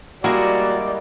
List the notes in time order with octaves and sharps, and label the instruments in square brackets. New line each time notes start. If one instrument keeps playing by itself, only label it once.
[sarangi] G3 [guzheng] G#3 A#3 E4 [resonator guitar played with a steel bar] F#4 [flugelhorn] D5